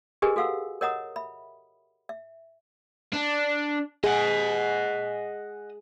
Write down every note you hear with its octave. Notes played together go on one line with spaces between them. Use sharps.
G4 G#4 A#4 B4 D#5 G#5
F#4 A4 F5 F#5 E6
A#4 C#5 D#5 F#5 A#5 D#6
E5 B5
E5
D4
G#4 D#5 F#5